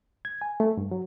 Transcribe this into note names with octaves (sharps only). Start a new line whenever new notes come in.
G#6
G#5
A3
G2
F#3